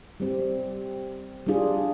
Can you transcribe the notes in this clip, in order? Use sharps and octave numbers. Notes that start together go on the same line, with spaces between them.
G3 C4 G4
G3 D4 F4 G#4